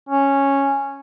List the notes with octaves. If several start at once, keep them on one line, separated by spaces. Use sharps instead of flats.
C#4